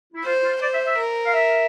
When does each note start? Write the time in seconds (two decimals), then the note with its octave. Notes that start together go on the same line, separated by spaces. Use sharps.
0.13 E4
0.24 F4 C5
0.43 F4
0.61 C5 D5
0.73 E5
0.86 E5
0.98 A#4
1.25 F5
1.34 E5